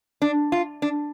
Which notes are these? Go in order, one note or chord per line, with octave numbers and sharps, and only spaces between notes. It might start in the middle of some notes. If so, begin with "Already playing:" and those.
D4
F4
D4